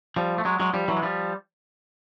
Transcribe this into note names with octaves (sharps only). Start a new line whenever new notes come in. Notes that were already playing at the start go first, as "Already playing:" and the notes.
F3 G3
A3
F#3 G#3
F#3 G#3
F3 G3
E3 F#3
G#3
F3 G3